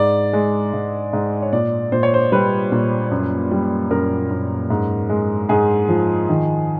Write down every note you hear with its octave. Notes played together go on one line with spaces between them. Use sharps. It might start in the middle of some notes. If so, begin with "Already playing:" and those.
Already playing: G#2 D5
G#3
G#2
G#2
C#5
A#2 D5
A#2 C5
C#5
C5
G3 B4
A#2
F#2
G3
F#2 A#4
F#2
G#2
G#3
G#2 G#4
F3
D#3